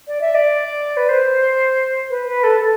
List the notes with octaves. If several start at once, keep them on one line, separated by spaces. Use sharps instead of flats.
D5
E5
D5
B4
C5
B4
B4
A4
A4